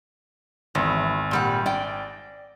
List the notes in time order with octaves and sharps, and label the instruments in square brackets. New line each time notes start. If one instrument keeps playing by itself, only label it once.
[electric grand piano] G#1 [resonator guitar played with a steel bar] E2
[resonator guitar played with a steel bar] A#2 G3 F#5
D5 G5